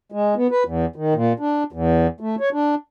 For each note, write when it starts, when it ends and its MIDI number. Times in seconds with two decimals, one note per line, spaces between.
0.12 0.34 56
0.36 0.47 59
0.51 0.64 71
0.66 0.86 40
0.96 1.14 51
1.14 1.33 46
1.40 1.63 62
1.72 2.07 40
2.20 2.36 57
2.40 2.49 73
2.53 2.75 62